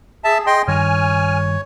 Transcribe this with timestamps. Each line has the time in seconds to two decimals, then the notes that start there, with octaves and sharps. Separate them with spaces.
0.24 G#4 E5 A5
0.47 D#5 G5 C6
0.68 G2 D#3 C#5 G#5 F6